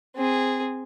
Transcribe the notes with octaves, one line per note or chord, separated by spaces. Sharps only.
C4 G#4